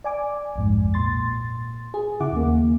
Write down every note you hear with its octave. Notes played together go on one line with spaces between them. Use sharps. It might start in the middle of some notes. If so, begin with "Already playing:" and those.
D5 G#5 D6
B1 F2 G#2
A#2 C6 A6
G#4
C#3 E4 F#5 D6
D#2 A#3